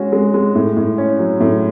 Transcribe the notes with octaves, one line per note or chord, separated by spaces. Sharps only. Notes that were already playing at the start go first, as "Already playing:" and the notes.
Already playing: G#3 C#4 F#4
G#3
G#3
A2
A2
C#4
F#3
A2